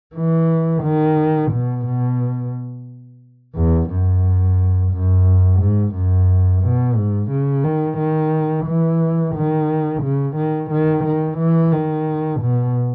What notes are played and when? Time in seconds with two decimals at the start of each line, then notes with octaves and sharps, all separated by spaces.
0.16 E3
0.83 D#3
1.51 B2
1.86 B2
3.55 E2
3.90 F#2
4.92 F#2
5.60 G#2
5.94 F#2
6.63 B2
6.96 G#2
7.31 C#3
7.64 D#3
7.98 D#3
8.66 E3
9.35 D#3
10.03 C#3
10.36 D#3
10.71 D#3
11.04 D#3
11.38 E3
11.72 D#3
12.40 B2